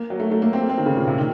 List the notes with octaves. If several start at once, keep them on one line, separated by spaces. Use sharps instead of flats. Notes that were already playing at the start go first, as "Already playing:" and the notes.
Already playing: A#3
F#3
A3
A3
A#3
C4
A#3
C4
D#3
C#3
A#2
C3
D#3